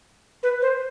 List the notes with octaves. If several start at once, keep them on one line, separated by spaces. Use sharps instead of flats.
B4
C5